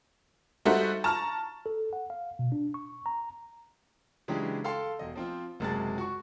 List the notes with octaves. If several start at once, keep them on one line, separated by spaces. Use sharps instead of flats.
G3 D#4 F#4 A4 C5 E5
A5 A#5 C#6 F6
A4
F#5
F5
B2
D4
C#6
A#5
C#3 E3 F#3 G#3 D4 G4
A4 F5 G5 A5 C6
E1 D#5
F3 C4 F4
F#1 C3 G#3 F#4 A5 A6
F#4 C#6